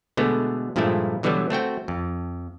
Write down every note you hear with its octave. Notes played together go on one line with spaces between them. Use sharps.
B2 D3 G#3 A3 B3
G2 A#2 F3 G#3 A3 E4
B2 D3 E3 F#3 G3 B3
A3 C4 F#4 G5
F2